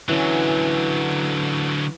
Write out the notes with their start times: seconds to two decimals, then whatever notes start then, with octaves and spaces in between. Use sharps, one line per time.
0.09 D3 E3 F#3 C#4